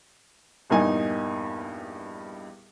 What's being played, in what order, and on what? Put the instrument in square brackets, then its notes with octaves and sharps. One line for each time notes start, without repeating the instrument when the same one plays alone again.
[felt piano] A#1 E2 G2 A#3 D#4 G#5